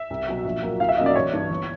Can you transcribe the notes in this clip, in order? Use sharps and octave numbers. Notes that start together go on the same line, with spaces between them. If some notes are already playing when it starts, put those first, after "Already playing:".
Already playing: E5
C2
B2 F#3
A#1
A#2 F#3 A#3
C2 F5
E5
B2 F#3 A#3 C#4 D#5
D5
A1 C#5
G2 E3
G1